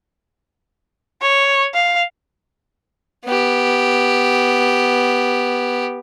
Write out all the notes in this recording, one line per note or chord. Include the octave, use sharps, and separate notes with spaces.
C#5
F5
B3 G4